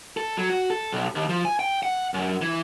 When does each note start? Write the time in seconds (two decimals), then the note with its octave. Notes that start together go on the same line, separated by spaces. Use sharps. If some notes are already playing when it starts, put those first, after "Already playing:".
0.17 A4
0.37 F#3
0.50 F#4
0.70 A4
0.93 B1
1.15 D#2
1.29 F3
1.45 G#5
1.59 G5
1.83 F#5
2.14 F#2
2.42 E3